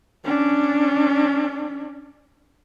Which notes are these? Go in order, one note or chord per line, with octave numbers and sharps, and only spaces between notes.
C#4 D4